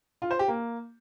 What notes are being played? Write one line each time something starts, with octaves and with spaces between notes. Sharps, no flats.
F4
C5
G4
A#3